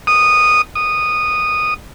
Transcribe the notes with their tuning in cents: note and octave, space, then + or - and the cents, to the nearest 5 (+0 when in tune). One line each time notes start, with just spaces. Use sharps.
D#6 -10
D#6 -10